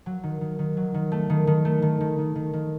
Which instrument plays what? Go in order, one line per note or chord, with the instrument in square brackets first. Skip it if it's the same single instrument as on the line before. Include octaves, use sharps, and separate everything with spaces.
[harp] F#3
D#3
D#3
D#3
F#3
D#3
A3
D#3
D#3
A3
D#3
D#3
D#3
D#3
D#3